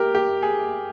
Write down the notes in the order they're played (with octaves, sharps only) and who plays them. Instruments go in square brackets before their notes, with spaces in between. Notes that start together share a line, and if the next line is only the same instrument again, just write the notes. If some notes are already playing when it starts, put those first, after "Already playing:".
Already playing: [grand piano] G4 A#4
G4
G#4